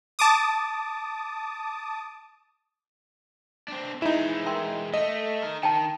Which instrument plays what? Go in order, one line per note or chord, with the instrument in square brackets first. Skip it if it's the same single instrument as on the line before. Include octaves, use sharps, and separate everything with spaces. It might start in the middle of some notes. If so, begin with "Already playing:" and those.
[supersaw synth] A5 D6 D#6
[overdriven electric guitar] C4 D4
[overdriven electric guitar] E3 G#3 [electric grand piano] D#4 E4
[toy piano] A#4 G5 C6
[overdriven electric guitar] A3 [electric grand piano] D#5
[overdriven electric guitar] D#4 A#4
[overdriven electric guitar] D#3 [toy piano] G5 A5